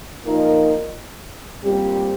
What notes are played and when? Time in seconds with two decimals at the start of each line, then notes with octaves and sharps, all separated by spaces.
0.23 A#2 F3 D#4 A#4 D#5
1.63 A#2 G3 C4 G4